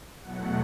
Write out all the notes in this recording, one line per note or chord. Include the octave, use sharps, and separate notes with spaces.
E2 B2 F#3 A3 F#5